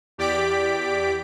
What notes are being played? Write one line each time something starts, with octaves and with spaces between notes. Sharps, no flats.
E2 G4 D5 D6 B6 D7